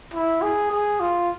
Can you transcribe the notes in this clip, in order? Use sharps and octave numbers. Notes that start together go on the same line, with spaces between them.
E4
G#4
G#4
F4